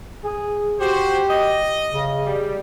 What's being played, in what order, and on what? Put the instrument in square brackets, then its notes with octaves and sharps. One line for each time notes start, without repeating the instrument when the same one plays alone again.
[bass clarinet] G#4
[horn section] F#4 C5 [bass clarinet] G4
[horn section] D#5
[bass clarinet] C#3
[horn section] G3